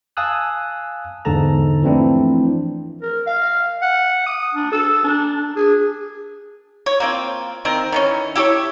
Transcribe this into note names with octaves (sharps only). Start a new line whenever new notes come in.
F5 G#5 A5 D#6 E6 F#6
E2 G#2 D3 A4 A5 A#5
E3 F3 A3 C4 D4 E4
A#4
F5
F#5
D#6
D4
A4
D4
D4
G#4
C#5
A#3 C4 F4
D#3 C4 A#4
D#3 E3 C#4
E4 G4 A4 C#5